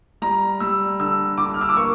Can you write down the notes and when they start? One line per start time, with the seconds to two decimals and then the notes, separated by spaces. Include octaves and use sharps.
0.22 G3 A#5
0.60 G3 E6
0.99 D3 E6
1.38 D3 D6
1.54 F6
1.61 E6
1.69 D6
1.77 A#3 C#6